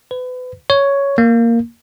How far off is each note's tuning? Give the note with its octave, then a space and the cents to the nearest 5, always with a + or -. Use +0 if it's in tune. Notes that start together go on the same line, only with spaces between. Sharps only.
B4 +30
C#5 +5
A#3 -5